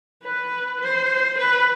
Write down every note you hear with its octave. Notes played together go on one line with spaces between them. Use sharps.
B4
C5
B4